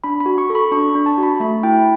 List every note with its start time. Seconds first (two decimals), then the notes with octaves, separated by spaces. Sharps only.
0.04 D4 B5
0.20 B5
0.26 F#4
0.38 C#6
0.50 A4
0.55 B5
0.71 D4 C#6
0.90 B5
0.95 D4
1.06 A5
1.18 F#4
1.23 B5
1.40 A3 B5
1.63 E4 G5